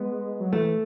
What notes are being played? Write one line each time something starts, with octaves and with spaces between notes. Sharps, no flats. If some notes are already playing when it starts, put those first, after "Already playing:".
Already playing: G#3 B3
F#3
E3 A3